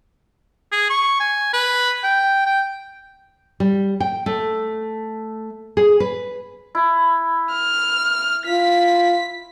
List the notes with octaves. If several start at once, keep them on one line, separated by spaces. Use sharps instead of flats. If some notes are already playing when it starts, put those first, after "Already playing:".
G#4
C#6
G#5
B4
G5
G5
G3
G5
A3
G#4
B4
E4
F6
F4 B6